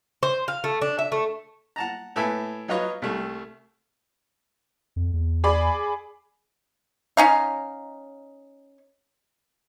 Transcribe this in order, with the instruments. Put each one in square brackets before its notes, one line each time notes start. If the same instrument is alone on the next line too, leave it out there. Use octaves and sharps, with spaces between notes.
[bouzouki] C5
F5
A3
D4
E5
A3
[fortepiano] F#5 A5 A#5
A2 A4 B4 E5 G#5
F#3 D#4 F4 B4 C#5 D#5
C2 G3 A3
[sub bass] F2
E2
[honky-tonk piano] G#4 D5 B5
[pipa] C#4 D#4 F5